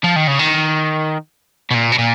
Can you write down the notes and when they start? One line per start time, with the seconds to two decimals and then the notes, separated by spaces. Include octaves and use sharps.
0.04 F3
0.16 D#3
0.27 C#3
0.39 D#3
1.70 B2
1.74 A#2
1.92 B2
1.98 A#2